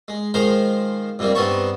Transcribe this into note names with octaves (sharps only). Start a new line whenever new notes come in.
G#3
D#3 F3 G#3 C5 F5 A#5
F2 C3 G3 A#3
G2 B3 C4 D#4 A5 C#6